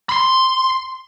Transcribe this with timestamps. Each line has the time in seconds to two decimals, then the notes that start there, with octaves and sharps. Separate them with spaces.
0.09 B5 C6